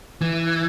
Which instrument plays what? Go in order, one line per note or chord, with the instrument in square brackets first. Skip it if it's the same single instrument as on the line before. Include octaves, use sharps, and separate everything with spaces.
[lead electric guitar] E3